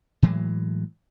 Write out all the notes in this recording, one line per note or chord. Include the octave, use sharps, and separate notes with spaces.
A2 E3 F#3 G#3